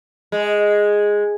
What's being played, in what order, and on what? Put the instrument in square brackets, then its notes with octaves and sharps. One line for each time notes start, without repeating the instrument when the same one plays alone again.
[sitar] G#3